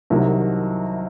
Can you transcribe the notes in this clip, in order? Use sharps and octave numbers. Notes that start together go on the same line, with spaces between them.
C2 C3 D#3 F#3